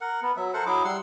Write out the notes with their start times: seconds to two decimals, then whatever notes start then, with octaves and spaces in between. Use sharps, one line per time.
0.01 A#4 F#5
0.22 B3
0.37 F#3 E5
0.54 A4 A#4 C5 F#5
0.66 F#3 E4 G#4 D6
0.85 G3 F#5 C6 E6